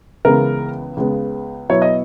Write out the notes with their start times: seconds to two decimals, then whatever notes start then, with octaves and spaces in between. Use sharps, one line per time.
0.25 C#2 C#3 E3 G#3 B3 A#4
0.97 C#2 C#3 G#3 B3
1.69 B2 F#3 B3 E4 C#5
1.82 D#5